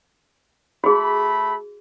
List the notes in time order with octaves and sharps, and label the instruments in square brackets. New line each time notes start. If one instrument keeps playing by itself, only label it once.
[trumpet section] A3 B5 [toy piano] F#4 G#4